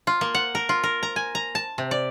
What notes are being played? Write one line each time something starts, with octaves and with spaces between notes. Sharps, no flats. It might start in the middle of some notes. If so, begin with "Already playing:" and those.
F4
A#3
F#5
A#4
F4
A#4
A#5
G#5
A#5
A5
C3
D5